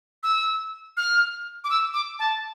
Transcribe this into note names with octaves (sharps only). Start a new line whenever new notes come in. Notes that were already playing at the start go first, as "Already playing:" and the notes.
E6
F6
D6
E6
D6
A5